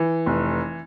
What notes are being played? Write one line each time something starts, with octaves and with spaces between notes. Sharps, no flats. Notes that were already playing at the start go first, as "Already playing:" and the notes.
Already playing: E3
F1